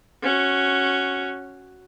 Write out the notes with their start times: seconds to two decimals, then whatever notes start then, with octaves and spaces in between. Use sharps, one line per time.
0.23 C#4 F#4